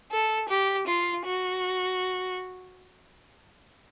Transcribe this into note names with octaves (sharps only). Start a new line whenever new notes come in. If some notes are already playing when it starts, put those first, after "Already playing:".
A4
G4
F4
F#4